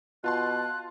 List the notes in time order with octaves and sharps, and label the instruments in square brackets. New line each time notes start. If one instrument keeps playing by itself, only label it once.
[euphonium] B2 [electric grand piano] F4 A5 C6 [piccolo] F#6